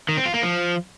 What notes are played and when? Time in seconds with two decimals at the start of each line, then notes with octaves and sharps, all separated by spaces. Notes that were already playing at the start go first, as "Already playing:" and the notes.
0.09 D#3
0.17 C4
0.25 F4
0.34 A#3
0.42 F3